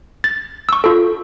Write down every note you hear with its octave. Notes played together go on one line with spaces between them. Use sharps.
A6
C#6 E6
F4 A4